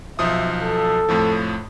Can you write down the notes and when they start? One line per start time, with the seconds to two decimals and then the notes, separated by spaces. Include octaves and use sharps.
0.19 B1 F3 E5 D#6
0.63 A4
1.09 F2 A2 F3